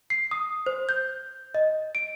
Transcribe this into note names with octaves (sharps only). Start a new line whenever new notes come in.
C7
D#6
C5
G6
D#5
D7